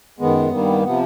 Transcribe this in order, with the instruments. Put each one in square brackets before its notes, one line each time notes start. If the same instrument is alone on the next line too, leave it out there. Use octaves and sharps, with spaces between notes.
[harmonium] F#2 D#3 G#3 B3
G2 D#3 G3 A#3
C3 F3 B3